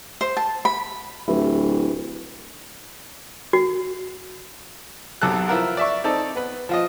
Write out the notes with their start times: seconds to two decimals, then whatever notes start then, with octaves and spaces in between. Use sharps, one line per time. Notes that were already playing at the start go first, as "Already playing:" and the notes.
0.21 C5
0.37 A5
0.65 B5
1.28 D1 E4 G4 B4
3.53 F#4
5.22 B1 F#2 C3 A4 F#6
5.48 F3 E4 F4 A#4 B4
5.77 D5 E5 C#6
6.04 C4 D#4 A4 D5
6.35 B3 B4
6.69 F3 F4 D#5